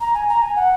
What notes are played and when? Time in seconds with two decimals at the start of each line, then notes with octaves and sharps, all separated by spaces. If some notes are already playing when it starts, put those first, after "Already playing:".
0.01 A#5
0.14 G#5
0.29 A#5
0.42 G#5
0.56 F#5